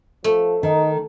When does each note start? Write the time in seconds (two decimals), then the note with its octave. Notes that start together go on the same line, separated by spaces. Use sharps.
0.24 F3 A3
0.63 D#3 D#4